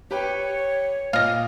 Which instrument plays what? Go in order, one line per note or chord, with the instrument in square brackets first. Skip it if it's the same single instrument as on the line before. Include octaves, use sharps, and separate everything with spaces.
[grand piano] G4 B4 G5 [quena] C#5
[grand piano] A#2 [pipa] D#5 F5